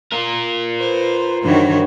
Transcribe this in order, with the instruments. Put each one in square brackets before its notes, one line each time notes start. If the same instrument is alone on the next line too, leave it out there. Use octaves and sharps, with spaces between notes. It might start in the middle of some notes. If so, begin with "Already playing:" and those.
[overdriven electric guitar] F4 A#4
[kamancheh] B4 C5
[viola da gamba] G2 E3 C#5 [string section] D#3 [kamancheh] F#4 C5